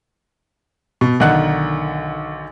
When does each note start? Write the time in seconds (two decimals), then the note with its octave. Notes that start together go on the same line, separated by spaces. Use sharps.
1.01 B2
1.20 B1 D3 D#3 F#5 F#6